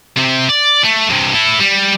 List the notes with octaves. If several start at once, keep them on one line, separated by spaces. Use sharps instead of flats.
C3 C4
D5
A3
G2 C3
E4 A4
G3